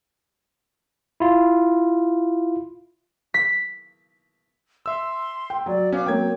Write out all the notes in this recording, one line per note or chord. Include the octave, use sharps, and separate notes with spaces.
E4 F4
B6
E5 C6 E6
G5
F#3 D5
B3 C#4 F5 D6
F#3 A#3 C4 C#5 G5 G#6